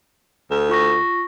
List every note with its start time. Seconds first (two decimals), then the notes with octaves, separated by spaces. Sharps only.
0.51 D2
0.69 F4 C#6 A#6